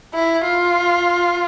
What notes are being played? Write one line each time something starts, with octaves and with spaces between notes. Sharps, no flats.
E4
F4